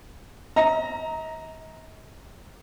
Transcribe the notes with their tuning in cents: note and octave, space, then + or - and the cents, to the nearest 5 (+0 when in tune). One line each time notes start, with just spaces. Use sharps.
D#5 +45 A#5 +0